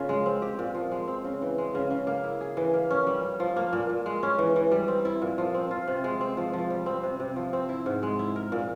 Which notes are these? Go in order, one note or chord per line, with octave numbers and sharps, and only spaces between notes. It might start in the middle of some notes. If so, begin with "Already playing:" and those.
Already playing: C#3 A#3 F4
G#3
C4
G4
A#2
F3
G#3
C4
C#3
E3
G#3
C#3
C#3
A#3
E4
G#4
E3
A#3
C#4
G3
G3
F3
A#3
A#2
A#2
G#3
C#4
E3
E3
G3
C4
E4
A#2
F3
C4
F4
C3
G#3
C4
F3
F3
G3
C4
C3
C3
F3
C4
E4
G#2
G#3
E4
A#4
A#2